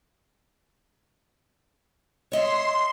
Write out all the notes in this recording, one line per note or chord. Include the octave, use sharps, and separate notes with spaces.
C#5 D#5 E5 C6